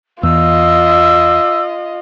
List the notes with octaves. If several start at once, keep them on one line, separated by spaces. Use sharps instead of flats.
E2 E3 F4 D#5 E6